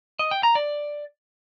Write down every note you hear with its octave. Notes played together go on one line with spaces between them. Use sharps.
D#5
G5
A#5
D5